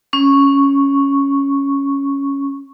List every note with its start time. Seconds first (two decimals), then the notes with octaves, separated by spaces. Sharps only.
0.13 C#4 C#6